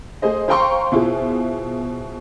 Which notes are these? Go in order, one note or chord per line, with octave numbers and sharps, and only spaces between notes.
A3 G#4 C5 D#5
C5 F5 G5 A#5 C6 C#6
B2 E4 F4 G#4 C5